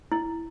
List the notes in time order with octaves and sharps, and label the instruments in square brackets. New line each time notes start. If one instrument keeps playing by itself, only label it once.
[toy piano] E4